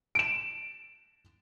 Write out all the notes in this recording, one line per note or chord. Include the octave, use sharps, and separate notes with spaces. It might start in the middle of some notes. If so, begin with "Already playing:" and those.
D7 E7